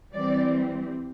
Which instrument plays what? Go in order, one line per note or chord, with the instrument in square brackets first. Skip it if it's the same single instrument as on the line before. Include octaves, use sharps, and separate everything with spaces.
[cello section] E3 G3 C4 D5